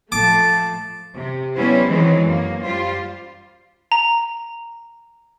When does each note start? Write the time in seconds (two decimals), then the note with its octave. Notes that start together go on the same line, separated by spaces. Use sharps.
0.12 F3 A3 A5 D6
1.14 C3
1.55 F#3 G3 B3 C#4 E4 C5
1.87 D#3 E3 F#3 G#3 C4
2.23 F#2 A#3
2.64 G3 F4 C5
3.92 A#5